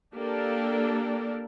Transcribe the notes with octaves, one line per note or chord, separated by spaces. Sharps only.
A#3 D4 G4 A4 A#4 D5